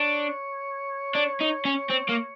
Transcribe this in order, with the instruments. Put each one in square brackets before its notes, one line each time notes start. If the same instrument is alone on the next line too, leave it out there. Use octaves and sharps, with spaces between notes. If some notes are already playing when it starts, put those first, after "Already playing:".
Already playing: [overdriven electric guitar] D4 [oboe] C#5
[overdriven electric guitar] D4
D#4
C#4
C4
A#3